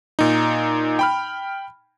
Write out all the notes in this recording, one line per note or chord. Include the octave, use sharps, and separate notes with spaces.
A#2 D#4
G5 B5 F6